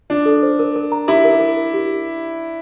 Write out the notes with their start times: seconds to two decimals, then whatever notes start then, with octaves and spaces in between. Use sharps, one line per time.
0.10 D4 F4
0.26 A4
0.43 C5
0.59 A#4
0.76 A#4
0.92 A#5
1.08 E4 G4
1.25 A#4
1.41 A#4
1.57 A#4
1.74 G4